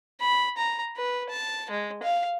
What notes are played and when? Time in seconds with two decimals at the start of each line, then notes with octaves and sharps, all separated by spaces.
0.20 B5
0.57 A#5
0.96 B4
1.29 A5
1.70 G#3
2.03 F5